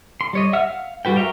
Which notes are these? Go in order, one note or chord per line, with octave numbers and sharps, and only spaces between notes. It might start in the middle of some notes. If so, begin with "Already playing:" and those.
C6
G3 C#5 D#5
E5 F#5 E6 F6
F5
G3 F#4 B4 G5
A#4 C#5 E5 F5 G5